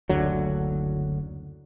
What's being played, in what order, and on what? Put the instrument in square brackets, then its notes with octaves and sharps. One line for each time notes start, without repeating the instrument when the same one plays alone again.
[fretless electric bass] F#1 D2 D3 F#3